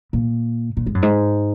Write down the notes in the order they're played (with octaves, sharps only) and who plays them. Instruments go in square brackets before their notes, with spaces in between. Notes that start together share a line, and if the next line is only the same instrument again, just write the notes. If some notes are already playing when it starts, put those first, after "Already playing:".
[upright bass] A#2
A#2
G#2
F#2
G#2